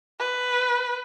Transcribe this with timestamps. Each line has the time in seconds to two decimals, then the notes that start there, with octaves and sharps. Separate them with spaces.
0.20 B4